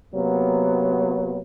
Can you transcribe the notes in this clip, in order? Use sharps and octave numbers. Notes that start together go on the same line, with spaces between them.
C3 F#3 A#3 B3